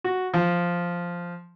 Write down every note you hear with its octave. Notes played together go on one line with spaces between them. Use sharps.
F#4
F3